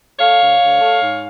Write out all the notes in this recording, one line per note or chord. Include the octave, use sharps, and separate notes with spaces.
A3 C#5 F5
D2
D2
A3
G#2